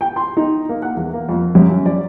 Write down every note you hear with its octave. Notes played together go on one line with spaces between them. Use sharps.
G5
C6
D#4
A#3
F#5
E2
A#3
F2
F#2
C#4
D5